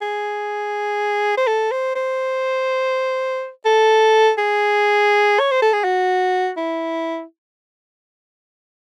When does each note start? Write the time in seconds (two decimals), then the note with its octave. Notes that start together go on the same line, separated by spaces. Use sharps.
0.02 G#4
1.37 C5
1.47 A4
1.72 C5
1.96 C5
3.65 A4
4.38 G#4
5.40 C#5
5.51 C5
5.62 A4
5.73 G#4
5.85 F#4
6.57 E4